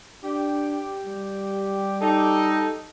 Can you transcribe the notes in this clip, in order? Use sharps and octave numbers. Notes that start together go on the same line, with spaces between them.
D4 G4
G3
D#4 A4